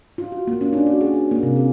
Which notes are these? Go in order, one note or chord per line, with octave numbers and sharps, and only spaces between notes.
F4
F#4
A#3
C#4
D4
F#4
G#4
F#4
A#3
C3
G#4